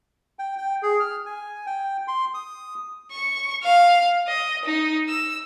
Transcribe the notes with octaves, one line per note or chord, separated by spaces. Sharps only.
G5
G5
G#4
F6
G#5
G5
C6
D#6
C#6
F5
D#5
D#4
E6